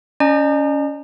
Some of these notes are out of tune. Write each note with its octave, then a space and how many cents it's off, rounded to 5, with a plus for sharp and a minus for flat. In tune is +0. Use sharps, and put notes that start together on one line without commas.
C#4 +20 D#5 -45 A#5 -30